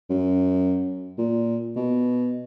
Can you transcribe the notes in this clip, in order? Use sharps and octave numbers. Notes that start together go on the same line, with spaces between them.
F#2
A#2
B2